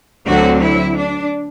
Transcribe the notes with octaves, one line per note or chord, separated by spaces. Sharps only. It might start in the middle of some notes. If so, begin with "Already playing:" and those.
D2 D3 F#3 C4 F#4
E4
D4